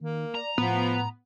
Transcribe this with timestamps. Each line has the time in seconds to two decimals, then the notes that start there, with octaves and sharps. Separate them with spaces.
0.01 D#3 A#3
0.35 D5 A#5
0.58 A2 F3 B3